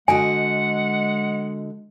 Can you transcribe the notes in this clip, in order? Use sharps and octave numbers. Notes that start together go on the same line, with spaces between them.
D3 G#3 F#4 D#5 F#5 G#5